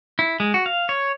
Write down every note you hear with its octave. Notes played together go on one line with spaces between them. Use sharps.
E4
G#3
F#4
F5
C#5